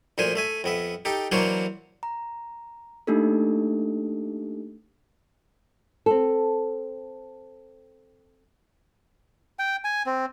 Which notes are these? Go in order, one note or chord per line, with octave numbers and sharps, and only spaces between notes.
D2 A#2 F3 C5 G#5
A3 E5 G#5
F2 B3 E5
D#4 G4 A4
E3 F#3 A#3 D4 C5 C#5
A#5
A3 A#3 D4 D#4 G4 A4
C4 A4
G5
G#5
C4